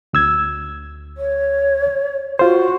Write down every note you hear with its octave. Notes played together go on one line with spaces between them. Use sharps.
D2 E6 G#6
C#5
F4 F#4 C5